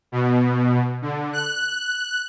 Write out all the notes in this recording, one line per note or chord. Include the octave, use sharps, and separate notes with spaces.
B2
D3
F#6